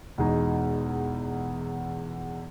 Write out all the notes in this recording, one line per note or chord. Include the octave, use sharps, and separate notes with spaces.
E2 B2 G#3 D#4 G#4